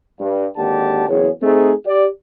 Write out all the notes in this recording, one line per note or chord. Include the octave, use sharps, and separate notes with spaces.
G2
G#1 D#2 D3 G4 A5
F#1 E2 G#4 C#5
A3 C4 D#4 G#4
G4 D5